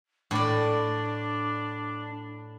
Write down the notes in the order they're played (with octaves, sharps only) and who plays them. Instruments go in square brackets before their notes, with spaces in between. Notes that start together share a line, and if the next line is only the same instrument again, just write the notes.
[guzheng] A2 D5 [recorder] D4